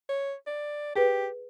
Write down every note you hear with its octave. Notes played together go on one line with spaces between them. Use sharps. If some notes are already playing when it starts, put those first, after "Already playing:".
C#5
D5
G4 G#4 B4